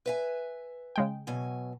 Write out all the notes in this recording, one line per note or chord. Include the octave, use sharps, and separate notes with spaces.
B4 E5 G#5
C#3 G#3 G5
B2 F#3 G#5